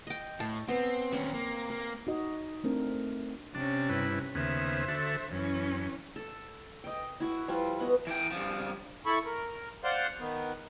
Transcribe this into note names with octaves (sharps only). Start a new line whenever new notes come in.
D#5 G5
A2 A5
B3 C4
D#2 C4 C#4
A#3
A#3
D#4 F#4 D#5
A3 C4 D4 A#4
C3 C#4 D4
G2 E4 B4
D#2 C#3 B3 C5 E5
D3 F#4 A4
F#2 E3 C#4
A4
D#5 G5
E4 F#4
F3 G3 E4 F4
B3 F#4 D#5
E3 G5
G2 F3
E4 A4 B5 C#6
A#4
C5 D5 F5 F#5 C6
D#3 B3